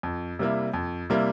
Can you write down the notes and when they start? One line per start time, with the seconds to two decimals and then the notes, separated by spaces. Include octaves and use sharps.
0.03 F2
0.39 C3 G3 A#3 E4
0.74 F2
1.10 C3 G3 A#3 E4